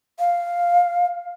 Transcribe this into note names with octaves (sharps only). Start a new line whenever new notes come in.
F5